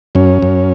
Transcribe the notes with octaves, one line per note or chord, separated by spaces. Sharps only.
F#2 C#4
F#2